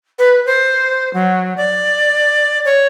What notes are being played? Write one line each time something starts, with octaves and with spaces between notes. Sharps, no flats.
B4
C5
F#3
D5
C#5